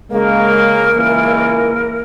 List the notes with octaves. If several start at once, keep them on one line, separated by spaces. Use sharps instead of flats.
C#3 G#3 A#3 A#4
C#2 E3 A#3